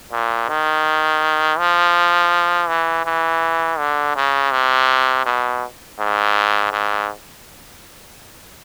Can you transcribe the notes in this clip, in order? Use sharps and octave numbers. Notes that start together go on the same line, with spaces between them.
A#2
D#3
F3
E3
E3
D3
C#3
C3
B2
G#2
G#2